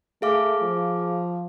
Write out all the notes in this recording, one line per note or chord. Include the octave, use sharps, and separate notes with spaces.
A3 G#4 F5 D6
F3